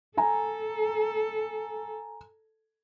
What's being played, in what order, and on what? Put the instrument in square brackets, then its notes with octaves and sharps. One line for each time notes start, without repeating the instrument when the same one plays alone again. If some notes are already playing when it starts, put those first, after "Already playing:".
[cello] A4 [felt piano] G#5 A#5